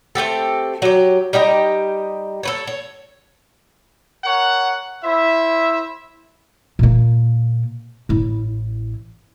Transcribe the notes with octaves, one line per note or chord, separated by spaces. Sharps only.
A3 C4 G4 A4
F#3 G4
G3 D#4 G4 D#5
A4 B4 C#5
C#5
A#4 C#5 F#5
E4 C5 E5
A#2 A#3
A1 E4